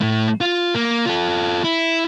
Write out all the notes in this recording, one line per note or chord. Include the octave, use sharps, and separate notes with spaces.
A2 A3
F4
A#3
F4 A4
E4